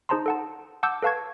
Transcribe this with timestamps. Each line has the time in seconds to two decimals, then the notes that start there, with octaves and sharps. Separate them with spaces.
0.09 D#4 G#4 C5 A5 A#5 C6
0.26 A4 F#5 A5
0.83 F#5 A5 D6 E6 G6
1.02 A4 B4 F5 A5 C#6 G#6